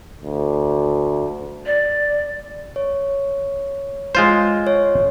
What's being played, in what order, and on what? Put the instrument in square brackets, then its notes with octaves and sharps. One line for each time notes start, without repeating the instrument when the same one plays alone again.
[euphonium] D2
[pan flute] D5
[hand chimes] C#5
[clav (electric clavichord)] G#3 F4 C5
[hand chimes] C#5